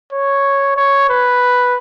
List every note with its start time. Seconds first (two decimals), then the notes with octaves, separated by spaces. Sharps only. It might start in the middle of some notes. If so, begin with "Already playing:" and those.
0.13 C#5
0.77 C#5
1.09 B4